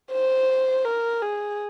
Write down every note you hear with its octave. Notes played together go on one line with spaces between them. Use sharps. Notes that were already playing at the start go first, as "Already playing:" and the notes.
C5
A#4
G#4